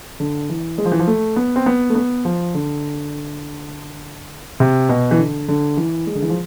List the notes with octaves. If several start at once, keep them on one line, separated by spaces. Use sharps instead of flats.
D3
E3
G#3
F3
E3
F3
A3
B3
C4
B3
A3
B3
F3
D3
C3
B2
E3
D3
D3
E3
G#3
D3
E3
F3